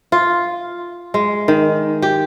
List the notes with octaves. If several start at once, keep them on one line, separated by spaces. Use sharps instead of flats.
F4
G#3
D#3
G4